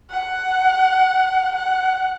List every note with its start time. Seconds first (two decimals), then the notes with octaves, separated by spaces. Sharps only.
0.10 F#5
1.55 F#5